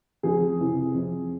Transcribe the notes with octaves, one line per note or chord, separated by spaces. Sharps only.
F2 G#4
C3 E3
F2